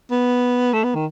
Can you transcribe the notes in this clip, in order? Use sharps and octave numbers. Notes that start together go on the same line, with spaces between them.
B3
A3
B3
D#3